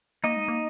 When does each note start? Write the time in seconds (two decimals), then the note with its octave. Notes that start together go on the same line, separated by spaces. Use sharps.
0.24 A#3 D#4 D#5
0.37 G#3
0.48 A#3